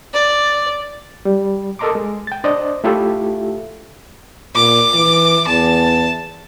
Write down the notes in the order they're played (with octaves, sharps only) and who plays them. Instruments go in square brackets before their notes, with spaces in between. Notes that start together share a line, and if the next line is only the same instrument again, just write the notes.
[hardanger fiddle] D5
[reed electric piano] G3
A4 A#4 D#5 A#5 C6 D6
G#3
G5 A6
D4 C5 D5 D#5
A3 E4 F4 G4 A4 E5
[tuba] A#2 [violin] D6
[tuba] E3
[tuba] E2 [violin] A5